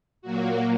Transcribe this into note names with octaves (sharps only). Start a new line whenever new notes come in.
A#2 F#3 A#3 F#4